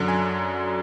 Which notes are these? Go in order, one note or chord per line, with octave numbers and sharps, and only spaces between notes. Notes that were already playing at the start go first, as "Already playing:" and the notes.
Already playing: F#2 D3 F#3
G#5